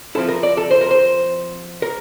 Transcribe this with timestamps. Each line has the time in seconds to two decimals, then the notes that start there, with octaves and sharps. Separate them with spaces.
0.15 F3 C4 E4 A4
0.29 A#4
0.43 D5
0.57 A4
0.71 C5
0.81 A#4
0.91 C5
1.82 A#4